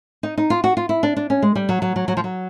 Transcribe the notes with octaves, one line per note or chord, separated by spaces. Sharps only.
D#4
D#4
F4
F#4
F4
E4
D4
D4
C#4
G#3
G3
F#3
F#3
F#3
F#3
F3
F#3